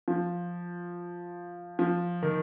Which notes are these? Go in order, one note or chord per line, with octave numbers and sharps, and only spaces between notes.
F3
F3
D#3